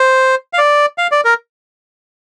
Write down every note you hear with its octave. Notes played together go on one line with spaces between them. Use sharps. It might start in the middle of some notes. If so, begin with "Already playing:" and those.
Already playing: C5
F5
D5
F5
D5
A#4